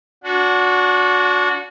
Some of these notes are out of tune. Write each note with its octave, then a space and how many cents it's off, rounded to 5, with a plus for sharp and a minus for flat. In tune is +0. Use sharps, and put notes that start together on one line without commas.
D4 -30 F#4 -20 F#5 +0